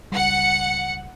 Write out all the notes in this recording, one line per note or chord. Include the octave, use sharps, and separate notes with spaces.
C#2 G3 F#5 C#7